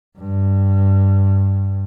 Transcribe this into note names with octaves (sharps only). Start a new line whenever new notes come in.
G2